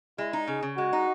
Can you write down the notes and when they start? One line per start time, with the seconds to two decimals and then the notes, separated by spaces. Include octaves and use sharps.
0.18 G#3 E4
0.33 D#4
0.47 C#3 G#4
0.63 C#3
0.77 G#3 F#4
0.93 D#4